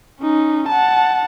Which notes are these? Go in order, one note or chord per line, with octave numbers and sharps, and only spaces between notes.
C#4 D#4
F#5 A5